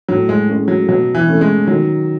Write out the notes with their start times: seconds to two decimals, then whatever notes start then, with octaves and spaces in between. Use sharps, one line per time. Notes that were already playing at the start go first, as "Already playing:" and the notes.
0.08 A2 F#3
0.29 G#3
0.49 G#3 C#4
0.68 F#3
0.88 B2 F#3
1.15 E3
1.28 A3 C#4
1.41 G#3
1.67 D#3 F#3